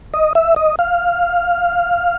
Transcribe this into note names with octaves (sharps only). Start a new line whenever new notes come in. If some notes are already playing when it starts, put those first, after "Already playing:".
D#5
E5
D#5
F5